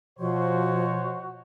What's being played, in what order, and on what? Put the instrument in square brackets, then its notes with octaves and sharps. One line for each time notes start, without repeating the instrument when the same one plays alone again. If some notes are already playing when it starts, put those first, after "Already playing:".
[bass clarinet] B2 [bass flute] F3 [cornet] F#4 [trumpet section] C5 C#5